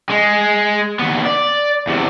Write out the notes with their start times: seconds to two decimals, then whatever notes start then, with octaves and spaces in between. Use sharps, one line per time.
0.09 G#3
0.99 D#2 B3
1.25 D5
1.88 E2 C3